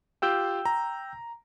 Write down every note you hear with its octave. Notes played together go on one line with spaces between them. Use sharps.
F4 G4 F5 G5 E6 G6
A#5